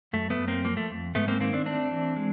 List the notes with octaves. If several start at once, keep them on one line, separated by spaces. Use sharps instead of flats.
F#2 A3
A3 B3
F#2
A#3 C4
F3 A#3
A3
F2
G#2 A3 B3
A#3 C4
D#3 A#3 C4
C4 D4
A3 C4 D4
E3
G#3